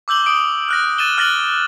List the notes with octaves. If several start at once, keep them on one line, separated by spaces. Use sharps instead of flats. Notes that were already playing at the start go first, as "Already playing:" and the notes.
D6 E6 G6 F#7 G7
D#6 D7
F6 F#6 A#6
A6 D#7 E7 G7
F6 F#6 A6 A#6 F#7 G7